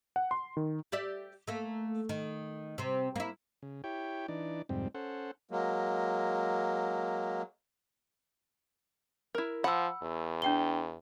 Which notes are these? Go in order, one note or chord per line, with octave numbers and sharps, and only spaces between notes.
F#5
C6
D#3
G4 D5 E5
A3 A#3
D#3
C3 C4
A#3 E4
C#3
E4 G4 C#5 G5
E3 D4 D#4 D5
F2 G#2 C3 G3 C4
C#4 A4 C5 F#5
F#3 G#3 A#3
E4 A#4
F3 F#5 B5 E6
E2
D4 G5 G7